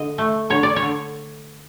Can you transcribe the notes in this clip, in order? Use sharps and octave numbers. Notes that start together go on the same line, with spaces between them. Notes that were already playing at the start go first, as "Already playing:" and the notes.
Already playing: D3 D#5
A3
D3 C#5
D5
C#5
D3